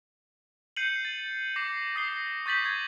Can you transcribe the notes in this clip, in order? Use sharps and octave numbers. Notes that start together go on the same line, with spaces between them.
G6 C7 C#7 D#7 F#7
A6
D6 A#6 C7
D#6 A#6 C7 G7
C#6 G6 A6 B6 F#7
G#6